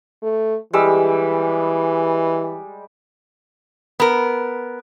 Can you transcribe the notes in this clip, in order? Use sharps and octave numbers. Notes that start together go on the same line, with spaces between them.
A3
E3 G3 G#3 E6
B3 A#4